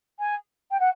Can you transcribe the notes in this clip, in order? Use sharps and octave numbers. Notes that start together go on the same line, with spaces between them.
G#5
G5
F#5